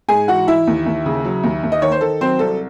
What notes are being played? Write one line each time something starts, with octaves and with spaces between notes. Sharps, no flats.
G#2 G#4 G#5
E3 F#4 F#5
E3 E4 E5
D#2
D#2
C#3
F#3
D#2
D#2
D#5
D#3 C#5
C5
D#3 A4
F#3 C4 C5
C2 A4